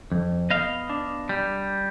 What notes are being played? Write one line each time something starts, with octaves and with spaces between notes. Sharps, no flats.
F2
B3 D#5 F5
D4
G3